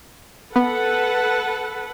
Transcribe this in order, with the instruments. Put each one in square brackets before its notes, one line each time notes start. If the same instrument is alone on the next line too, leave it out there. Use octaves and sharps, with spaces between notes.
[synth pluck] B3 [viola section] A4 B4 F#5